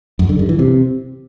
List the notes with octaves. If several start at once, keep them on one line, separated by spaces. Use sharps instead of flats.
F#2
D3
G2
E3
C3